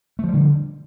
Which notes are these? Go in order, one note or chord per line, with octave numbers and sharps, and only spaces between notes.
D3 F3 G3 A3